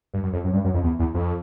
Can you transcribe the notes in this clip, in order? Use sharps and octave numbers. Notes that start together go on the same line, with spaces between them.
G2
F#2
F2
F#2
G2
F#2
F2
E2
E2
F2